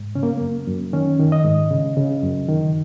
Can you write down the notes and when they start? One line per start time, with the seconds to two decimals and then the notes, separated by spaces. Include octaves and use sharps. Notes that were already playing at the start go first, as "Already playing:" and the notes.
Already playing: G#2
0.15 C#3 C#4
0.23 A#3
0.37 F#2 A#3
0.68 F#2
0.93 D#3 C#4
1.19 D#3
1.32 D#5
1.44 G#2
1.71 C#3
1.97 C#3
2.23 F#2
2.48 D#3